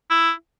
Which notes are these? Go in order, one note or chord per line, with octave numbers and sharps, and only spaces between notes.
E4